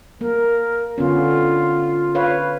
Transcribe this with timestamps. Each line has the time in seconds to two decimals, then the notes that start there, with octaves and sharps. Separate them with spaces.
0.21 A#3 A#4
0.98 D3 B3 C#4 F4
2.15 B4 C#5 F5